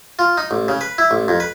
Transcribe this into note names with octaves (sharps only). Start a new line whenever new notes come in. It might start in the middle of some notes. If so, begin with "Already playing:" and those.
F4
D#4
A1
C#3
B4
E4
A1
F2
B4